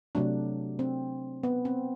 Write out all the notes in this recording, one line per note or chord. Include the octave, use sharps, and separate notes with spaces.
C3 F#3 A3 D4
C4
B3
C4